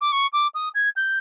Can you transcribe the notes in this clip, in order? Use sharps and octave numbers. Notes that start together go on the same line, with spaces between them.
D6
C#6
D6
D#6
G#6
G6